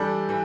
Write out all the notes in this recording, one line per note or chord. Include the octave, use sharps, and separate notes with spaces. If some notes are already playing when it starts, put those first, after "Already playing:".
Already playing: E3 G3 D4 A4
E3